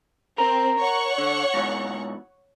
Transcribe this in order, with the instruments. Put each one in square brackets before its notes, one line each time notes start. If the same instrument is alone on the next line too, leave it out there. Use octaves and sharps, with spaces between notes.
[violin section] C4 [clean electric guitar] A#4
[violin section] C#5 F#5 C#6
[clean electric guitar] D3
G#2 B2 E3